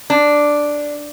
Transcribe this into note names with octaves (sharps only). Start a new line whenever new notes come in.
D4